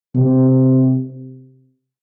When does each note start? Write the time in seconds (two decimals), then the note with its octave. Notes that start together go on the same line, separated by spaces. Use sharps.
0.15 C3